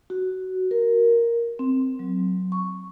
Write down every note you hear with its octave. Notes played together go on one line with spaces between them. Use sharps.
F#4
A#4
C4
F#3
C#6